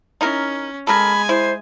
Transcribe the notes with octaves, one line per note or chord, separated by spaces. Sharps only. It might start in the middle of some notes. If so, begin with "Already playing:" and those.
C#4 D#4 E4 A#4
G#3 A4 A#4 G#5 B5
E4 C5